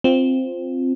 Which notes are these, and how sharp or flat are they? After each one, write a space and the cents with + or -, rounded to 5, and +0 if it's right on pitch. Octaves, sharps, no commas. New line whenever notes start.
C4 +0 F4 +0